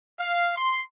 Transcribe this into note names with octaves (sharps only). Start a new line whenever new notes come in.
F5
C6